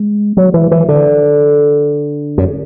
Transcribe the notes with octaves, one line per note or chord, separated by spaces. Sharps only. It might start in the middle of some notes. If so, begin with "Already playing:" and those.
Already playing: G#3
F#3
E3
E3
D3
F#2